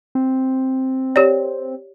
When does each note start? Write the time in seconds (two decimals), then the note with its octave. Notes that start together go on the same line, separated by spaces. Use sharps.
0.15 C4
1.16 G4 C#5 D5